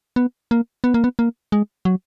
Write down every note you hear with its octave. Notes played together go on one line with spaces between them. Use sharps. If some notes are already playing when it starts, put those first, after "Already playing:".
B3
A#3
B3
A#3
B3
A#3
G#3
F#3